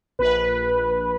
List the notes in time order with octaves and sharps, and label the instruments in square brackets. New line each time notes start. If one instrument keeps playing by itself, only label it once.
[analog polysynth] A#1 B4